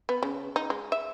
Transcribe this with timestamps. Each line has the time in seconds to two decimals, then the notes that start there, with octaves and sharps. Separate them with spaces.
0.09 B3
0.23 C#3
0.56 D#4
0.70 G#3
0.92 E5